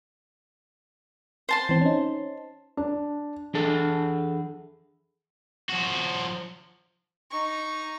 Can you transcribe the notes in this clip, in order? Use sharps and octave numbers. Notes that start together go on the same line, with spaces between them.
C5 A5 C6
E3 C4
C#4 D#4
D4
E3 D4 G#4 A4 A5
F3 F#4
D#4 C#6